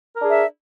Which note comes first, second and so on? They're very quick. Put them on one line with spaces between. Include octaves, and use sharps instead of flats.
A#4 D4 G#4 E5